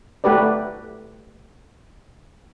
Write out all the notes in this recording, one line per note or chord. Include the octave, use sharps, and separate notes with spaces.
A3 F#4 G4 B4 D5